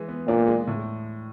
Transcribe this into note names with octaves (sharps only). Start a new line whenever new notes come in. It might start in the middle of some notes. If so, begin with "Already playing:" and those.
Already playing: E3 G#3
B3
A#2 D4
G#3
A2